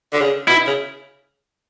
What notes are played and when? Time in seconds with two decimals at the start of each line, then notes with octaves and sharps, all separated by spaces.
0.13 D3
0.21 C#3
0.48 B2 E4
0.67 C#3